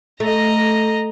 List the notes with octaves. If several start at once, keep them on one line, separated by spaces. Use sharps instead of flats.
A3 D#5 A#5